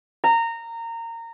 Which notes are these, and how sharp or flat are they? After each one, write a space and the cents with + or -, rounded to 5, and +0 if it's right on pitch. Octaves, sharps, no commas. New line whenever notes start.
A#5 -20